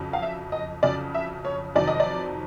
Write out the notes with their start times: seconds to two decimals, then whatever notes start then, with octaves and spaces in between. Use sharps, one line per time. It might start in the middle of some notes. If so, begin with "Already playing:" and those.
Already playing: F2 C#3 F#3
0.13 F5
0.22 E5
0.52 D#5
0.83 F2 C#3 F#3 D5
1.14 E5
1.45 C#5
1.75 F2 C3 D#3 F#3 D5
1.88 D#5
2.00 D5